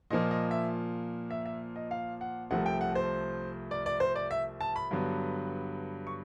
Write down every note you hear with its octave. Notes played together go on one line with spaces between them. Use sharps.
A#2 F3 A#3 D#5
D#5
E5
E5
E5
D#5
F5
F#5
C2 C3 F3 A3 F#5
G5
F#5
C5
D5
D5
C5
D5
E5
A5
B5
G2 D3 F#3 B3
C#6